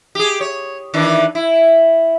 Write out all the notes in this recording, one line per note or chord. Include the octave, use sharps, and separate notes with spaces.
G4 G#4
C#5
D#3 E3 D4
E4